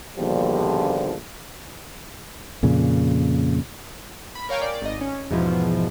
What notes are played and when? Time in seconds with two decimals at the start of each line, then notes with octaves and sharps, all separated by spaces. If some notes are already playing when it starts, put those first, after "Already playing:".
0.17 A#1 D#2 B2 D3 F3 G3
2.63 F2 A#2 C#3
4.35 B5
4.49 A#4 C#5 F5 G5 G#5
4.61 D5
4.82 G#1 D#5
5.01 C#4
5.30 E2 G#2 B2 E3 F3